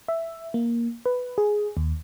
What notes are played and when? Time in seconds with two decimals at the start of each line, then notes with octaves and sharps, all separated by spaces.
0.08 E5
0.54 A#3
1.06 B4
1.38 G#4
1.77 D#2